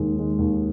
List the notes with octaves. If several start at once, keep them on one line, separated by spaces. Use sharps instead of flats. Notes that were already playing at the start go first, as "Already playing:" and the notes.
Already playing: D#2 D#3 G#3
D#3 G#3
D#2